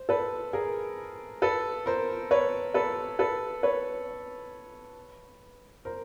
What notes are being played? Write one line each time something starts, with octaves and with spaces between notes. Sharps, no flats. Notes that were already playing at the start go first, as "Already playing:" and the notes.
Already playing: C5
A4 B4
G#4 A#4
A4 B4
A#4 C5
B4 C#5
A4 B4
A4 B4
B4 C#5
A#4 C5